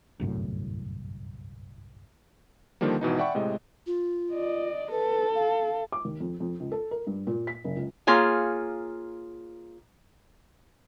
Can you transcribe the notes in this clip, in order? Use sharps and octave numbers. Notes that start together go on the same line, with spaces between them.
G1 C2 F#2 A2
D3 D#3 F3 G3 A#3
G#1 B2 E3 D#4
D5 E5 F#5 G5 B5 C#6
A2 C3 G#3 D#5
F4
D5 D#5
A4 B4
F5
D6
D#2
F2
F2
C#2
A4
A#4
G2
A#2
B6
F#1
C#2
A#3 F4 G#4 C#5 G#5